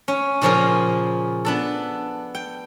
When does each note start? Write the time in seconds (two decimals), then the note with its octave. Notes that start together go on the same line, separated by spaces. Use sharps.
0.08 C#4
0.41 A#2 C#3 F3 C#4 G#4 A#4
1.45 B3 D4 A4
2.35 G5